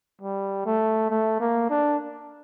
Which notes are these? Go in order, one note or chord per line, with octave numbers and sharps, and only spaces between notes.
G3
A3
A3
A#3
D4